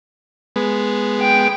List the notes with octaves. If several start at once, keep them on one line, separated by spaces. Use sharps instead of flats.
G#3 B3
G5